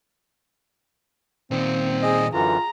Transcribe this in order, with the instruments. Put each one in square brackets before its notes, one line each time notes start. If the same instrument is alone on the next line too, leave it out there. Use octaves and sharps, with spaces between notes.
[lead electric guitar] A#2 D#3 [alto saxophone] C4
[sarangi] G#4 [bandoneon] D#5
[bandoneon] F#2 D3 E3 [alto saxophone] F4 [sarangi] A#5